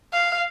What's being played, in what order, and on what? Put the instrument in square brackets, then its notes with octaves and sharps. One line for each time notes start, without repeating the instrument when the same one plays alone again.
[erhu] F5